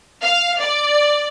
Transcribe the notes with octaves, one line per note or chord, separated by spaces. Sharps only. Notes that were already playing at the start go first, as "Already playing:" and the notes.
F5
D5